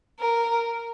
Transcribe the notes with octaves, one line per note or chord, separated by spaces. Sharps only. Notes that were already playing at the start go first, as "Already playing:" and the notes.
A#4